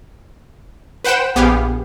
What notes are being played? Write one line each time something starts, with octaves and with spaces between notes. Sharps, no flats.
B4 C5 F#5 G5 E7
A#1 B3 G4 G#4 F5